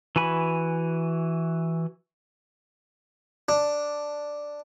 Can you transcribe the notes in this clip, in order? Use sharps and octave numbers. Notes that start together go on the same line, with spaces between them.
E3 F#4 G#5 B5
D4